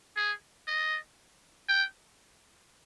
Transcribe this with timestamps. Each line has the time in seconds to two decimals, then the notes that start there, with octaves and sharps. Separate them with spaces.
0.17 G#4
0.67 D#5
1.69 G5